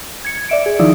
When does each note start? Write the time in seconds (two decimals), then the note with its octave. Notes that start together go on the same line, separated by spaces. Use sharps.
0.25 G#6 C#7
0.49 D5 E5 D7
0.66 G#4
0.79 D#3 F3 D#4 E4 D5